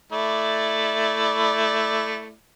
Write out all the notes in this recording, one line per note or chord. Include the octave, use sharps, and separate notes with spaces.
A3 E4 D5